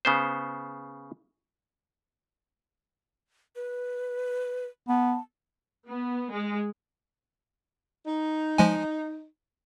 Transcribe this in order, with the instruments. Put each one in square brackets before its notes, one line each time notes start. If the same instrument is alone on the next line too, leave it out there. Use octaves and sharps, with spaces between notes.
[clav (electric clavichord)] C#3 B3 C5
[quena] B4
[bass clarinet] B3 [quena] A5
[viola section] B3
G#3
[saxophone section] D#4
[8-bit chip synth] F3 G#3 G#5